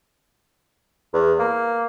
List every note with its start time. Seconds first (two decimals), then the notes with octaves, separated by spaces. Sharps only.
1.13 E2
1.39 A#3